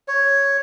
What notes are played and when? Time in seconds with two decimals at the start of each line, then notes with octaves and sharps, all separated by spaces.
0.08 C#5